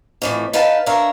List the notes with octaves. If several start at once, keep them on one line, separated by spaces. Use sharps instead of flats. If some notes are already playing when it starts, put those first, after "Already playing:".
F2 A2 E3
D#4 B4 F5 F#5 A5
D4 A#4 C#5 E5 F5